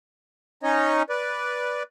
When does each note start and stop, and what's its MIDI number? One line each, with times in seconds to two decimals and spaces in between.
0.63 1.03 61
0.63 1.03 63
0.63 1.03 73
0.63 1.03 75
1.10 1.83 71
1.10 1.83 74